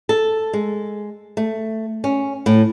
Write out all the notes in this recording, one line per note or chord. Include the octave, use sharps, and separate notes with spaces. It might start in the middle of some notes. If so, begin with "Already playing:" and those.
A4
G#3
A3
C#4
A2